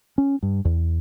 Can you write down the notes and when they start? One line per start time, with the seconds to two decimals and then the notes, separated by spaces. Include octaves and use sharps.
0.18 C#4
0.43 G2
0.65 E2